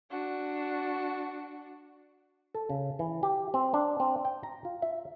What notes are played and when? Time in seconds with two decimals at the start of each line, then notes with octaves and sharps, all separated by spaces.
0.11 D4 F#4
2.55 A4
2.70 C#3
2.99 E3
3.23 G4
3.54 C4
3.74 D4
4.00 C4
4.25 G5
4.43 A#5
4.65 F4
4.82 E5